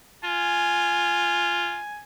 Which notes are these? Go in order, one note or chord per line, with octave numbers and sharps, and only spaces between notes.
F4 G#5